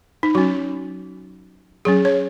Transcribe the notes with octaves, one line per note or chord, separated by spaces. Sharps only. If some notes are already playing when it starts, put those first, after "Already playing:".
D#4
F#3 C#4 F#4
F#3 C#4 G#4
C#5